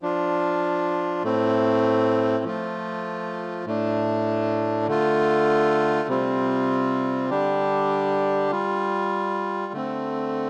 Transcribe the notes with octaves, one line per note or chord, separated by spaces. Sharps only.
F3 D4 F4
A2 A3 C4
F3 A3 F4
A2 A3 D4
D3 A3 F4
C3 G3 C4 F4
D3 G3 D4 G4
G3 F4
D3 A3 C4